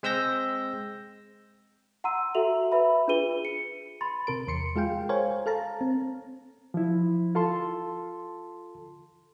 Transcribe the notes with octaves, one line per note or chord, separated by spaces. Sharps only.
G#3 C4 E6 G6 A#6
F#5 A#5 C6 E6 D#7
F#4 A4 E5 F7 F#7
B4 E5 B5
D4 F4 G#4 B4 D#7 G7
C#7
B5 C6 A6
C3 A#4 D7
E2 C6 C#7
G#3 F4 G#4 F5 G5
A#4 C5 C#5 F5 G#5
A4 F5 A5 A#5
C4
F3 E4
F4 A4 A5 C6